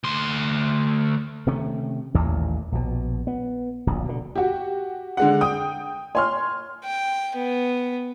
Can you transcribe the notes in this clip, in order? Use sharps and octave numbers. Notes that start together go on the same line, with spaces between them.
D2 C6
C3 D#3 A3 C#4
A1 D#2 A#2
A#1 B2
B3
D1 A#1
B2 D3
F#4 G4
D3 G#3 F#5
G5 D#6
C#5 G#5 C6 F6
G5
B3